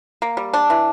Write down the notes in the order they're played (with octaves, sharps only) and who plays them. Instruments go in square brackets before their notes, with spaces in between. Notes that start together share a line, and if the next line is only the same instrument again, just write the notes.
[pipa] A#3
G3
D4
E3